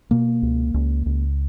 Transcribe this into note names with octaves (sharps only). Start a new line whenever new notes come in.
B2 A#3
C#2
C#2
C#2